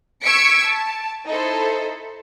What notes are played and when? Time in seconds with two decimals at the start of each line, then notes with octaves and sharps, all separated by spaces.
0.23 C#6 E6 G#6 B6 C#7 D7
0.65 A5
1.28 D#4 E4 A4 C5